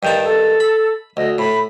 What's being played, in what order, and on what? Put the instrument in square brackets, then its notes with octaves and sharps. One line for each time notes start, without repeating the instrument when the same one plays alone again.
[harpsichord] G2 D#3 A5 [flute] G5
[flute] A4
[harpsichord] B5
[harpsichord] D2 [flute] D#5
[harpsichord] A2 [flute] B5